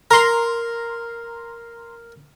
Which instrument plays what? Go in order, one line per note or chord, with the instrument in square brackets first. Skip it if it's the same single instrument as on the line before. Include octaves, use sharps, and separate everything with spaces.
[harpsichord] A#4 [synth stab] A#5 C6